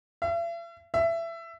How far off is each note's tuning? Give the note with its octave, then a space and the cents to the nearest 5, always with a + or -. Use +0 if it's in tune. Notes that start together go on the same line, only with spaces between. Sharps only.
E5 +45
E5 +20